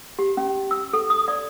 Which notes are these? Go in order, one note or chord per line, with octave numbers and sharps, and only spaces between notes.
G4
C#4
E6
A4
D#6
D5